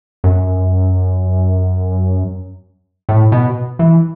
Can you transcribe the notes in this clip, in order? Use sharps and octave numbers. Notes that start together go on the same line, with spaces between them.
F#2
A2
B2
E3